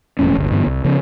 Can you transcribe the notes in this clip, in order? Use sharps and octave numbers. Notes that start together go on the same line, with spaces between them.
E1 F2 A2 C#4
D1 G1
G2 D3 E3 B3
C2
C#3 F3 B3 C#4